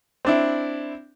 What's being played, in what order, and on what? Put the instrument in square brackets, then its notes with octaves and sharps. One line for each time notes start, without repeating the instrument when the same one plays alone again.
[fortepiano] C4 D4 E4